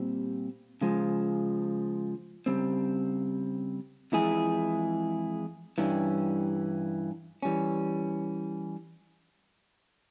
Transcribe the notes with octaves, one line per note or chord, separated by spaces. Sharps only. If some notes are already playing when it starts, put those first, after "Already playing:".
Already playing: A#2 G3 C4 G4
C#3 F3 G#3
C#3 G3 C4
F2 E3 G#3 E4 G#4
G2 E3 G3 C#4
E3 G3 C#4